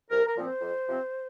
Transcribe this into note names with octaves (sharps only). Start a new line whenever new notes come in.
C2 A#4
A#4
A#2 F3 C4
C5
F2
C3 F3 C4